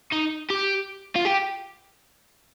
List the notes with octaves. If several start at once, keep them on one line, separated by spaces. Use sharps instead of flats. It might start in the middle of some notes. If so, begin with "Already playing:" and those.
D#4
G4
F4
G4